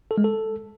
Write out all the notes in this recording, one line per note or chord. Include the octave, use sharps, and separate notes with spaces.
A4
G#3
A4